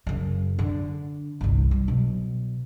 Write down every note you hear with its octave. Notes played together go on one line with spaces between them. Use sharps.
F#2 C#3
D3
G1 C2
G3
B2 F#3